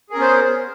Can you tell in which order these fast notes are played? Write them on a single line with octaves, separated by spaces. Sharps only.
G#4 A#4 C#4 B3 C5